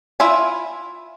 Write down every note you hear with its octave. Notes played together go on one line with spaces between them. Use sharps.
E4 F4 E5 G#5